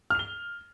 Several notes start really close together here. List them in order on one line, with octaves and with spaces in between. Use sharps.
F6 F7 G7